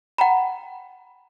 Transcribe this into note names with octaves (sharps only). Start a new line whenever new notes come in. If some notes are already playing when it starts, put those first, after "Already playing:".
F#5 G5 A#5 B5